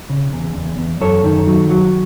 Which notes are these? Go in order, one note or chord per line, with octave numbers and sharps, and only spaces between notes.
C#3
E2
E2
E2
F#2 A4 C#5
D#3
F#3
F#3